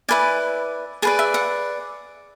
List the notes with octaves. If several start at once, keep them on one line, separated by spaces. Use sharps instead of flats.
E4 B4 D5 G#5
G#4 B4 D5 A5
E5
F#5